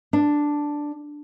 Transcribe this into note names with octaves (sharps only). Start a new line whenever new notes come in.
D4